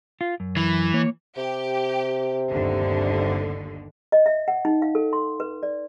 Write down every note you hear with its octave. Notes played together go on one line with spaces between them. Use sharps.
F4
F#2
E3
A#3 C#5
C3 G4
G1 D#2 D3
D#5
E5
F#5
D#4
F5
A4
C6
B4
D5